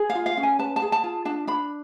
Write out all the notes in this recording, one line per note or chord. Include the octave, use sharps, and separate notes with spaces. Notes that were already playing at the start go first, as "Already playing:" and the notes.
Already playing: G#4
F5
F4
F5
C#4
G#5
B4 A5
A5
G#4
A5
F4
D4 A5
D4 B5